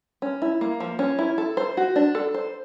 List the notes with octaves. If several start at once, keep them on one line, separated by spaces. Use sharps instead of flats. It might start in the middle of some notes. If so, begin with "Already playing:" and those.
C#4
E4
A#3
F3
C#4
E4
A4
C5
F#4
D4
A4
C5